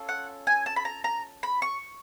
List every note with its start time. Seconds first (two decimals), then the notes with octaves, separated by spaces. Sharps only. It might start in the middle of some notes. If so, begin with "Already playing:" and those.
Already playing: C#4 F4 A4
0.09 F#5
0.47 G#5
0.66 A5
0.76 B5
0.85 A#5
1.04 A#5
1.43 B5
1.62 C#6